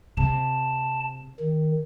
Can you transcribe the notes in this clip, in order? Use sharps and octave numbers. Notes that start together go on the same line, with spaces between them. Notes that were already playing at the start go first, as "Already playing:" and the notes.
C3 A5
D#3